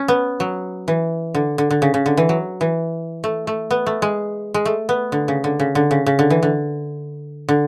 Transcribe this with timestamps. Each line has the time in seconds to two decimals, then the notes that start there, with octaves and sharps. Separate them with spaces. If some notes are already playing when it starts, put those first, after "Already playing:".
Already playing: C#4
0.08 B3
0.40 F#3
0.88 E3
1.35 D3
1.58 D3
1.71 D3
1.82 C#3
1.94 C#3
2.06 D3
2.17 E3
2.29 F#3
2.61 E3
3.24 A3
3.47 A3
3.71 B3
3.86 A3
4.02 G#3
4.54 G#3
4.65 A3
4.89 B3
5.12 D3
5.28 C#3
5.44 D3
5.60 C#3
5.75 D3
5.91 C#3
6.06 C#3
6.19 D3
6.30 E3
6.43 D3
7.49 D3